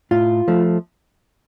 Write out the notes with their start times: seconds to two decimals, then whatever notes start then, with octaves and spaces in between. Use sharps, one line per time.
0.11 A2 F4
0.48 F3 A3